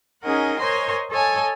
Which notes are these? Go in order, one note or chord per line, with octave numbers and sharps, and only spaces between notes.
C#4 D#4 G#4 A#4 D#5 F#5
A#4 C5 C#5 D#5 G#5 C6
A4 C#5 D#5 G#5 A5